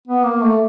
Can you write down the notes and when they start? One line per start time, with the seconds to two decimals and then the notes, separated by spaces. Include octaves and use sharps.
0.07 B3
0.24 A#3
0.43 A3